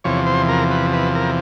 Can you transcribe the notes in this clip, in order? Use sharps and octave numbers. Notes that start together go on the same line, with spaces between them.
E2 C3 F3 C#5
C5
A#4
B4
B4
A#4